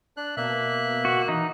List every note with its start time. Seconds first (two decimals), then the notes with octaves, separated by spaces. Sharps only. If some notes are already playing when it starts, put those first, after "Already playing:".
0.17 D4 F#6
0.37 B2 A#3 E5 F#6
1.05 F#4
1.28 E3 D#4